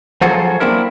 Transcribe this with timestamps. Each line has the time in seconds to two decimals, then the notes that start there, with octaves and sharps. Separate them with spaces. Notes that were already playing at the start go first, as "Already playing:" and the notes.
0.21 F3 F#3 F4 F#4 G#4 A4
0.60 A#3 C4 D4 E4 A#4